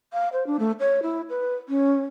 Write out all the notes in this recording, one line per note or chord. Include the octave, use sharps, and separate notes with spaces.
F5
C5
D4
A3
C#5
E4
B4
C#4